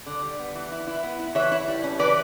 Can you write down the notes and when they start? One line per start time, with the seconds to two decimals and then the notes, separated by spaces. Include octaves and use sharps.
0.06 D3
0.22 G3
0.39 B3
0.55 E3
0.72 E4
0.87 E4
1.03 B3
1.19 E4
1.35 E3 C#5 E5
1.52 E4
1.68 G3
1.84 C#4
1.99 E3 B4 D5